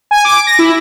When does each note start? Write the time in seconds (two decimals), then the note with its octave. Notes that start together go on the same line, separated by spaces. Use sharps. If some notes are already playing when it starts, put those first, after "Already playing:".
0.11 G#5
0.25 D6
0.47 A#6
0.59 E4